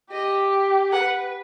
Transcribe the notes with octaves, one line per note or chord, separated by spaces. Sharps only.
G4 D#5
B4 F#5